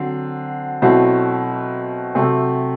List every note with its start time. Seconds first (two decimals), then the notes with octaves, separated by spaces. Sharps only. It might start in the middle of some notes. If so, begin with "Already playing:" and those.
Already playing: D3 F#3 C4
0.82 B2 F#3 A3 C4 E4
2.15 C3 F#3 A3 C4